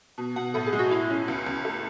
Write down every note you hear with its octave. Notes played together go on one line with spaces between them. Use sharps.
B2
B2 F#5
A2 A4
G#4
G#3
F#4
A2 E4
C#4 E4
C#2
C#2
A3